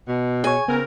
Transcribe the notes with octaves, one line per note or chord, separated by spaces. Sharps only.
B2
G#4 C#5 G#5
C#3 B3 C4 A#4